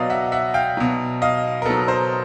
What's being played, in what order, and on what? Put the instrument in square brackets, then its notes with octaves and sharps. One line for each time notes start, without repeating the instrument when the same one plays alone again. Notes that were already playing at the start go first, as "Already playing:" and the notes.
Already playing: [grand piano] B2 F#3 B4 D5 D#5 F5
E5 F#5
E5 F#5
F5 G5
B2 F#3
D#5 F5
A#4
B2 F#3 A4 B4
A#4 C5